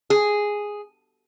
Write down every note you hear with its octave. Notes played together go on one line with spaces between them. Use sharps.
G#4